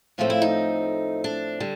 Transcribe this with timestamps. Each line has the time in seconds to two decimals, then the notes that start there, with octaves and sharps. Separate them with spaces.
0.18 A2 F3 A3 C4 F4
0.30 E4
0.42 D#4
1.24 D4
1.60 D3 G3